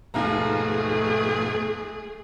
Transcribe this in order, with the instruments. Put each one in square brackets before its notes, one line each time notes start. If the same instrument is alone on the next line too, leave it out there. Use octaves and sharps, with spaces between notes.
[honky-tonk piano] D#2 F5 A#5 [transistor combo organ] G#2 B2 F3 [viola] A3 G#4